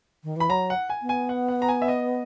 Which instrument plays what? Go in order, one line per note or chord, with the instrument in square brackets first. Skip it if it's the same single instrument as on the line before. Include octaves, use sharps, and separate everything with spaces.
[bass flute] D#3
[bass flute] E3 [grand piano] B5
[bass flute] F#3 [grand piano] A#5
[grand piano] F#5
G#5
[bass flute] B3
[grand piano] G#5
F#5
F#5
A#5
G#5
E5
D#5